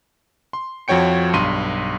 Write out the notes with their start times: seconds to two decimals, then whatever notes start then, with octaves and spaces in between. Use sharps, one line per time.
0.53 C6
0.88 F2 F3 F#4 C#5 G5 C#7
1.33 B1 G2 C6 D#7